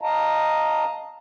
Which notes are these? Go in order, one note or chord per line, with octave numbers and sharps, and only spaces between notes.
D#5 F5 A5 A#5